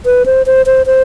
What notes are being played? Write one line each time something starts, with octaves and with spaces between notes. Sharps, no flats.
B4
C5
C5
C5
C5